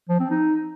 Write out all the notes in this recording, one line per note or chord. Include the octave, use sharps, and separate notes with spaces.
F3
C4
D#4